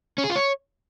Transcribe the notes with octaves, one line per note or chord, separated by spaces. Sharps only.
C#4
G#4
F4
C#5